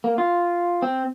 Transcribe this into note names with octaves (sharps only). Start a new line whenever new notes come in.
A#3
F4
C4